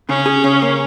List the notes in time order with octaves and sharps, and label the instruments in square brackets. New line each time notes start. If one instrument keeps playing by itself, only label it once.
[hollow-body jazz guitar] C#3 [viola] C#4
[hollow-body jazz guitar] G#4
C#3
A#3